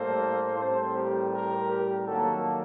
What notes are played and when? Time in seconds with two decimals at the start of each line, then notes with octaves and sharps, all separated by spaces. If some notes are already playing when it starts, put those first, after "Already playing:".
Already playing: A2 G3 A#3 A4 C5
0.57 A2 G3 C4 A4 C5
0.94 G4 A#4
1.32 G4 A#4
1.70 G4 A#4
2.07 D#3 F#3 A#3 F#4 A4